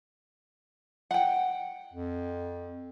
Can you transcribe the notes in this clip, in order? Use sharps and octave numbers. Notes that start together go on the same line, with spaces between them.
F#5 G5
F2